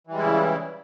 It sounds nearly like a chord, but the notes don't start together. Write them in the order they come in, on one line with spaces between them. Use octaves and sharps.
E3 G3 G#3 E4 C#3